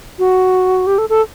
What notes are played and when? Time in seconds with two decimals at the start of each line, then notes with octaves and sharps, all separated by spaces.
0.19 F#4
0.87 G4
0.98 A4
1.09 A4